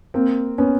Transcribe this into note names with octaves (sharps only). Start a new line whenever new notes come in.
A#3 C4
B3 C#4